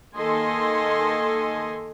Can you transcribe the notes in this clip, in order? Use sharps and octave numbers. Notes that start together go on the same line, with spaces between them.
D#3 A#3 A4 D#5 G#5 C6